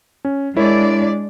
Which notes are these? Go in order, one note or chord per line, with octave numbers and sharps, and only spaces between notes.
C#4
G#3 D4 E4 A#4 C#5 D5